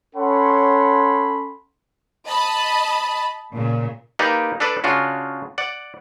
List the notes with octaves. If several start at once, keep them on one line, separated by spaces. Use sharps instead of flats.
C#4 A4 C#5 F#5 B5 C6
D#5 A5 B5
A#2 C#3
A#3 D#4 G4 B4 D5
D4 A4 B4 D5
C#3 D4 F4 F#4
D5 F#5